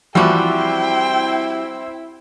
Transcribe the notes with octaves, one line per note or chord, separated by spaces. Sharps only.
E3 F3 G3 C4 E4 F#4 G5